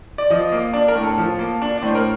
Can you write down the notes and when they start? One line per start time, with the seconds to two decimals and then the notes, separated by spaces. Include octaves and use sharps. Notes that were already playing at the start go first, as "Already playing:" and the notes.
0.18 D5
0.30 F3 D#5
0.52 A#3
0.73 D4 D5
0.88 A#4
0.95 A2
1.03 A4
1.18 F3
1.39 A#3
1.62 D4
1.78 D5
1.82 A2 C5
1.95 A#4